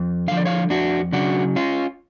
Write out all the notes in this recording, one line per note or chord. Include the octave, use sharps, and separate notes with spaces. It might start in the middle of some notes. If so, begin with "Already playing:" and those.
Already playing: F2
D3 F3 F5
D5
C#5 F5
F2 D4 F#4
C#3 F#3 D4 F#4
C#4 F4